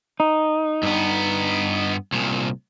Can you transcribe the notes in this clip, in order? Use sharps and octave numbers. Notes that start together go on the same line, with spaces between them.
D#4
G2 B3
C2 A#2